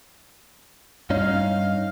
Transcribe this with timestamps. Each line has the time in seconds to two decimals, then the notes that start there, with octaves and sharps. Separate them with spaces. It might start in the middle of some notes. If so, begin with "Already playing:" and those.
1.10 G2 C#4 D#4 F5